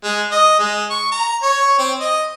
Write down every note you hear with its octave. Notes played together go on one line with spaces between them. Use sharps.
G#3
D#5
G#3
C#6
A#5
C#5
C4
D#5